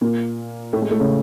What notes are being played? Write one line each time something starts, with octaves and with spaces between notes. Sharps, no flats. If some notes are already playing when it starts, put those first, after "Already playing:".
A#2 A#3
A2 A3
G#3
A2 A3
C#3 C#4